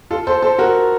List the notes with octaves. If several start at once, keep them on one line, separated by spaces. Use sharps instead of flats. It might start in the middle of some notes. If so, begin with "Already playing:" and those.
F4 A4
A4 C5
A4 C5
F#4 A#4